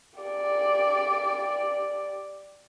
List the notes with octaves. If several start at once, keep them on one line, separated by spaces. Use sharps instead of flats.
G4 D5